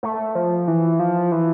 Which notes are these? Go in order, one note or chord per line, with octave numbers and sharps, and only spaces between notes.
A3
F3
E3
F3
E3